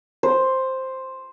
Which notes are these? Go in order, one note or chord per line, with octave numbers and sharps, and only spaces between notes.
C5